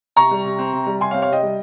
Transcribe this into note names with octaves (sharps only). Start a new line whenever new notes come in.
C3 A#5 C#6
G3
C3
C4
C3
G3
C3 G#5 C6
C#5 F5
C4
C#5 F5
C3 D#5 G5
G3